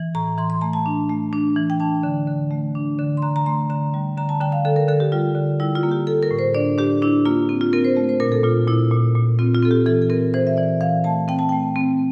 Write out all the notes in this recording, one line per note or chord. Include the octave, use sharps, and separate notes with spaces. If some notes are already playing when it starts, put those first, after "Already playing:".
Already playing: E3
A2 A#5
E3 C6
C6
A3 A#5
A5
D4
A3
D4
E3
G5
D4 A5
D3
D3
A3
D4
D3
C6
D3 A#5
A#5
A3 C6
D3 A#5
G3
D3 A#5
A5
D3 G5
F5
D3 A4
A#4
D3 A4
G4
G3 F4
D3
G3 E4
F4
A#3
G4
G3 A4
A#4
A2
C5
D4 D5
D4 G4
D4 E4
A#3 F4
C4
F4
C4 A#4
C5
A3
C5
A#2 A#4
A4
A#2 F4
A#2 E4
A#2
A#2
C4 F4
F4
C4 A4
G4
E3 A4
A4
C4 A#4
E3 C5
E5
E3 D5
E3 F5
A3 A5
C4 G5
A5
A3 G5
C4